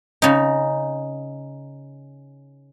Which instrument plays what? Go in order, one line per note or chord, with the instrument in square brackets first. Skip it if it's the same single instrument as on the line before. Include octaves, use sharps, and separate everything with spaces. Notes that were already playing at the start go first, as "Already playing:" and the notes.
[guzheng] C#3 D#4